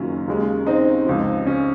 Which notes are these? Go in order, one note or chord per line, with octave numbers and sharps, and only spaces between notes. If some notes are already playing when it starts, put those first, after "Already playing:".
Already playing: F#1 F#2 D#3 F#3 C#4 F4
D#2 C#3 G#3
C4 D#4
C#2 C#3 F3
C#4